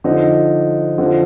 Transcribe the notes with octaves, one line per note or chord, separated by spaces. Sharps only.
D3 F3 D#4
D3 F3